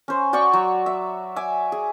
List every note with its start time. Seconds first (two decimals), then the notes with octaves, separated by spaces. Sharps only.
0.08 C#4 C5
0.33 F#4 D5 G5 C#6
0.53 F#3
0.86 E5
1.36 E5 G#5 D6
1.72 G#4